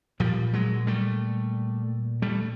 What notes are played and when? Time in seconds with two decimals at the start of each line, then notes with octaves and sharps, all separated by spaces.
0.20 A#2 F3 G3
0.53 F#3 G#3
0.87 G3 A3
2.22 G3 A3